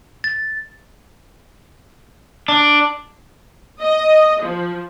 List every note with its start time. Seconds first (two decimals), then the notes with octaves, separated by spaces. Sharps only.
0.24 A6
2.48 D4
3.81 D#5
4.42 F3